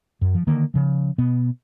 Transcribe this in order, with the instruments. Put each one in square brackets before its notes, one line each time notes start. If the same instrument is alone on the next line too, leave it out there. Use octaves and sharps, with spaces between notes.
[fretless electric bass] F#2
F3
D3 D#3 A#3
C#3 F3
B2 B3